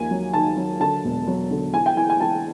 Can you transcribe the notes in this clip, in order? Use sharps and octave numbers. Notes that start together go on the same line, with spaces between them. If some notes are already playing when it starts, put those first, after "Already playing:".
Already playing: D#2 F3 G#5
F#3
D#3 A5
F#3
D3 A5
E1
F#3
D3
E3 G#5
G5
E3 G#5
G#5
E3 A5